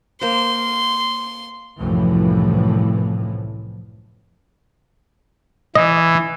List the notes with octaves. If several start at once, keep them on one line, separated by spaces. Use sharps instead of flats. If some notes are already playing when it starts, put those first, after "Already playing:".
A#3 C5 C6
C2 F#2 A2 E3 F3
E3 D#5